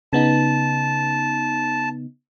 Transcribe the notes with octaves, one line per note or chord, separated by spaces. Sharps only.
C#3 B3 D#4 A5